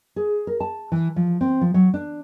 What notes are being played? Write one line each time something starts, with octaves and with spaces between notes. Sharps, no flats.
G#4
A#4
A5
E3
F3
C4
F3
F#3
D4